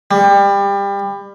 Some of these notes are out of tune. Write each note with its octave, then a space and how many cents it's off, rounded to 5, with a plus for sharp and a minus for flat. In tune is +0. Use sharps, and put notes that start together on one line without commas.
G3 +25